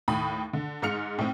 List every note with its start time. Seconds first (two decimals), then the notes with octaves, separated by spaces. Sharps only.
0.08 D#2 A2 B5 D#6
0.53 D3
0.82 G#2 G#3 F6 C#7 F7
1.19 A2 C4